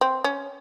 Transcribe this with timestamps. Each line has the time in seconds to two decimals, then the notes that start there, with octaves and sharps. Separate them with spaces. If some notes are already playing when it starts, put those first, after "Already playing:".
0.01 C4
0.24 C#4